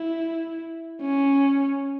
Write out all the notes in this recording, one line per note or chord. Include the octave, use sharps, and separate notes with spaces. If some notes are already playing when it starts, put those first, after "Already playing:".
Already playing: E4
C#4